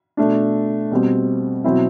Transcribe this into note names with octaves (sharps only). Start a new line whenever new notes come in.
B2 A3 D4
B2 G3 C4
B2 F#3 C4 E4